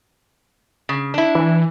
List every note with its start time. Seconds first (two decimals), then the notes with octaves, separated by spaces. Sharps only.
0.89 C#3
1.14 D4 E4
1.35 E3